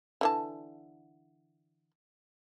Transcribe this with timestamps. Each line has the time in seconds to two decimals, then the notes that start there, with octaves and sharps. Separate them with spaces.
0.21 D3 E3 A5